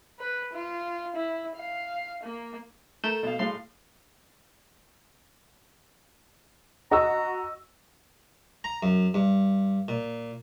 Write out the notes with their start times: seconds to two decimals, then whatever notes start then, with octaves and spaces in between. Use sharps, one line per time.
0.19 B4
0.53 F4
1.16 E4
1.56 F5
2.24 A#3
3.04 A3 A#4 G6 E7
3.23 B2 F5
3.39 A2 G#3 F5 C6
6.91 F#4 D#5 A#5 C#6 E6
8.64 A#5
8.83 F#2
9.14 G2
9.88 A#2